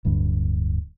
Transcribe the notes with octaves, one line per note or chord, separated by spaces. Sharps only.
D1 G2 D3